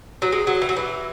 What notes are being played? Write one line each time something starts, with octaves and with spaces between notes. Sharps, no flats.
F#3
G#3
F#3
E3
F#3
E3